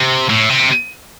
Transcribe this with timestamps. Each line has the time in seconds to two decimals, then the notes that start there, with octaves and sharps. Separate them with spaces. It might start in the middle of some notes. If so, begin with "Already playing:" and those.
Already playing: C3
0.29 A2
0.49 C3